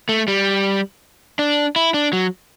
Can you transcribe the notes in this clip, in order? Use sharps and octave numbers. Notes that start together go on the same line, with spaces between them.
A3
G3
D4
E4
D4
F#3